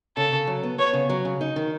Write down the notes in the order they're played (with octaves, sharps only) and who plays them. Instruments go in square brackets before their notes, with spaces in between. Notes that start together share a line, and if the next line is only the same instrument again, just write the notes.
[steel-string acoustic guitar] C#3 [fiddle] A4
[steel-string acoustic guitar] C#3
F#3
B3
[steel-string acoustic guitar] B3 [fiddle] C#5
[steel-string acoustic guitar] C#3
F#3
C#3
D#4
D#3